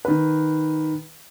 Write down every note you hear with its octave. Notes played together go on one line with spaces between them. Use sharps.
D#3 B4